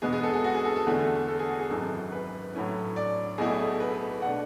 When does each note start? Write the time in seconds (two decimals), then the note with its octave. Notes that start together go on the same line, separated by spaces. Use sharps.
0.02 E2 B2 G#3 B3 G#4
0.13 G#4
0.23 A4
0.34 G#4
0.44 F#4
0.55 G#4
0.65 A4
0.76 A4
0.87 E2 D3 A3 E4
1.28 A4
1.39 G#4
1.49 F#4
1.60 G#4
1.70 G#1 F#2 E3 A4
2.12 B4
2.55 A2 F#3 A3 C#4 E4
2.96 D5
3.38 B1 B2 A3 E4 G#4
3.80 B4
4.22 B2 A3 D4 F#5